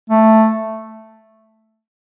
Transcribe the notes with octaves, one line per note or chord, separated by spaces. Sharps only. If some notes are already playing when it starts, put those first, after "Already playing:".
A3